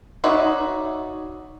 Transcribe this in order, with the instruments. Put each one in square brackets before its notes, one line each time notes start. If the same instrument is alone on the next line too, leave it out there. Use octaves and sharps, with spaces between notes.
[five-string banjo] D#4 F#4 C#5 D5 E5